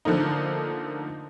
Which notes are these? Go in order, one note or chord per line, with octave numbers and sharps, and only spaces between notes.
D3 F3 A3 A#3 D#4